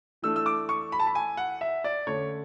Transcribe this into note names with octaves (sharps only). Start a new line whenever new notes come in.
E3 A3 D4 E6
E6
D6
C#6
B5
A5
B5
G#5
F#5
E5
D5
D3 A3 C#4 C#5